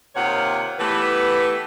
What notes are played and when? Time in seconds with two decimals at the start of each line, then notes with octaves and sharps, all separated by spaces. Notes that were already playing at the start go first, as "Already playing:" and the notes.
0.15 C3 D#3 A#3 F4 C#5 F#5
0.79 E3 A3 B3 G4 B4